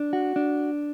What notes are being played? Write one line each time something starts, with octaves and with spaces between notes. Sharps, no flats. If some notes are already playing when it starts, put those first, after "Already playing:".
Already playing: D4
F#4
D4